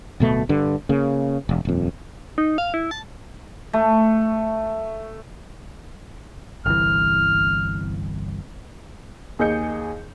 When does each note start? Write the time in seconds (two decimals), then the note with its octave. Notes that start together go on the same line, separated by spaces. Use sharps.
0.20 D1 B2 A3
0.49 G2 D3
0.89 C#3 A#3
1.49 E1
1.65 D#1 F2
2.38 D#4
2.58 F5
2.74 E4
2.91 A5
3.73 A3
6.66 G1 C2 E3 F6
9.39 D#2 G#4 D#5 G6 C#7